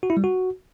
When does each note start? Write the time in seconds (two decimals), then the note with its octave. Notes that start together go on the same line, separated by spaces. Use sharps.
0.03 F#4
0.10 E4
0.17 G3
0.24 F#4